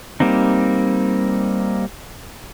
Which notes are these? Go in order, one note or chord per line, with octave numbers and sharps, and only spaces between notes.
G3 A#3 C4 D#4